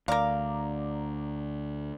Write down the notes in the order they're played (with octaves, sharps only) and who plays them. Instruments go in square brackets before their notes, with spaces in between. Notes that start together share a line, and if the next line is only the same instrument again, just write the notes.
[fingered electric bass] D2 [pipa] A#4 F5 [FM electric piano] D5 A#5 D6